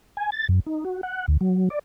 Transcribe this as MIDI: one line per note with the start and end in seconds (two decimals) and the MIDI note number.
0.17 0.30 80
0.32 0.47 93
0.49 0.60 42
0.66 0.84 63
0.85 1.01 66
1.03 1.26 78
1.28 1.37 38
1.41 1.69 54
1.70 1.79 74